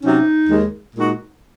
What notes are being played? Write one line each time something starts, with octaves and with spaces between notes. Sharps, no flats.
C3 F#3 C#4 D#4
D#2 D#3 G#3
A#2 G#3 D#4 F#4